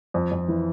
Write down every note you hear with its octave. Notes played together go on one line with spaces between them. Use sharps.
F2
F2
E3